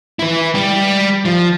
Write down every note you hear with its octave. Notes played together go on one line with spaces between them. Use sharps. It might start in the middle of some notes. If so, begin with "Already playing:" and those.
E4 B4
G3 G4
F3